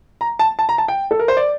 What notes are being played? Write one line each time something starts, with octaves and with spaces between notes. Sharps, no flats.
A#5
A5
A5
A#5
A5
G5
A4
A#4
C5
D5